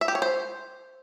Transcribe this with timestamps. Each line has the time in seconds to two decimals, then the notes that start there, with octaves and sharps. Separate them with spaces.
0.01 E5
0.08 G4
0.15 C#5
0.22 C5